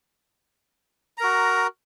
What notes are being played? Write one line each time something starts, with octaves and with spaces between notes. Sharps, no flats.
F#4 A#4 A#5